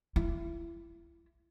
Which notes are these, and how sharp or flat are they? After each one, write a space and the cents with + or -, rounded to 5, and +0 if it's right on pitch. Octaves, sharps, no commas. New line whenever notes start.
E4 +30